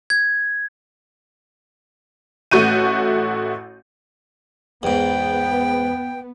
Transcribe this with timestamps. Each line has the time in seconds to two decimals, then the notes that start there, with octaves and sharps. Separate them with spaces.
0.10 G#6
2.51 A1 A3 F#4 C#6 G6 D#7
4.83 E2 G#2 B3 G5